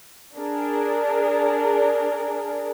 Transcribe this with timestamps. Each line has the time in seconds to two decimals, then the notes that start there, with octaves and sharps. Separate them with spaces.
0.37 D4 G#4 A#4